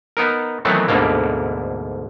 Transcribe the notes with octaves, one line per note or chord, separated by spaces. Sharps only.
B3 D#4 A#4
D#3 E3 F#3 A3 B3 C4
D2 G#2 B2 D3 A#3